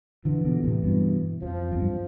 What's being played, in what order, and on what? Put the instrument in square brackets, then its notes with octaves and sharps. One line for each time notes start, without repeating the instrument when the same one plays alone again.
[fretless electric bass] D3 F3 [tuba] E3
[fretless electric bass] B2 D3
A2 C3
G2 B2
[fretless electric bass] F2 [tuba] F3
[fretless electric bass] F2
G2